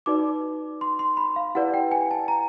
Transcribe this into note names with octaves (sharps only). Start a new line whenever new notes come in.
D#4 F#4 B4 D5 D6
C6
C6
B5
F5
E4 G4 B4 D5 F#5
G5
G#5
A5
A#5